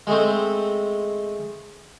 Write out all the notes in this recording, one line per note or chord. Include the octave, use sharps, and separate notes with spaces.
G#3 A3 C4